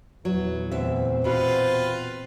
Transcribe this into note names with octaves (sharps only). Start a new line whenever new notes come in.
E2 A#2 E3 F#3
D2 C4 E5
B2 F4 F#4 B4